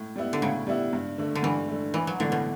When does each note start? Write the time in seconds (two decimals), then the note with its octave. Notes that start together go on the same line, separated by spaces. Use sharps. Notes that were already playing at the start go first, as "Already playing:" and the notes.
Already playing: A2
0.16 G3 B3 E4
0.33 D3
0.42 A2 C#3
0.67 G3 B3 E4
0.93 G2
1.18 D3 A3
1.35 D3
1.43 G2 E3
1.68 D3 A3
1.94 A1 E3
2.07 F#3
2.20 A2 D3 E3 B3 D4
2.32 B2